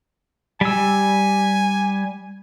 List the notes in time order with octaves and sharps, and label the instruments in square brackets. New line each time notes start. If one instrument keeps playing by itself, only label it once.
[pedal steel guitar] G3 E6 [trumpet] G#5